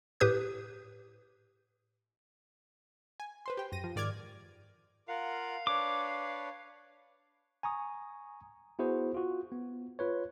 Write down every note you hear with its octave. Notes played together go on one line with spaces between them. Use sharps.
A2 G4 B4 D#6 G6
G#5
B4 C5 C6
G4 G5
F#2 A#6 D#7
F3
G#2 D#3 D5 D6 F6 G#6
F4 A#4 F5 F#5
D4 B4 C#5 D6
G#5 A#5 C#6 D#6
B3 E4 F#4 G#4 C5
F4 F#4
B3
F4 B4 C#5